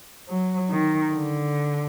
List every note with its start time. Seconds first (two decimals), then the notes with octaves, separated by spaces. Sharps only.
0.29 F#3
0.71 D#3
1.14 D3